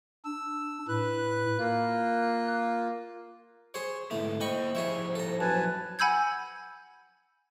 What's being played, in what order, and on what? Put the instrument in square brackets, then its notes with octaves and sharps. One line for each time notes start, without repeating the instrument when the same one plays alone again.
[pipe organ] D4 [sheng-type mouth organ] E6
[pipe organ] A2 [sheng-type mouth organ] B4 F#6
[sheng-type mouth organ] A#3 F4 [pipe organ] F#6
[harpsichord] G#4 C5 C#5
[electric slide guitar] G#2 D3 B3 [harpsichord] A3 [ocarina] E4
[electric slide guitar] A#3 G5 [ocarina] C5 [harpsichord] D#5 B5 C#6
[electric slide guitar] F3 G3 E4 [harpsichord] G#4 C#5 E5
[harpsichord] A4 A#5
[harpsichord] F#2 [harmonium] B4 G#5 A5
[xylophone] F#5 G#5 B5 E6 G6 G#6